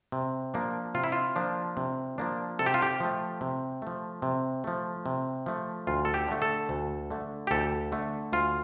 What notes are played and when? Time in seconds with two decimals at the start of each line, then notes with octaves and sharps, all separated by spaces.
0.12 C3
0.54 F3 A#3 D4
0.95 C3 F4
1.04 E4
1.12 F4
1.36 F3 A#3 D4
1.77 C3
2.18 F3 A#3 D4
2.59 C3 A4
2.66 G4
2.74 F4
2.82 G4
3.00 F3 A3
3.41 C3
3.82 F3 A3
4.22 C3
4.64 F3 A3
5.06 C3
5.46 F3 A3
5.87 D2 F4
6.05 A4
6.14 G4
6.28 D3 A3
6.42 A4
6.69 D2
7.10 D3 A3
7.47 G4
7.51 D2 A4
7.92 D3 A3
8.33 D2 F4